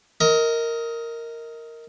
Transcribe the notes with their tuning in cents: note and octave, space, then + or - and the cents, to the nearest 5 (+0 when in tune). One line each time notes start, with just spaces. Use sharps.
A#4 -10 D#5 +25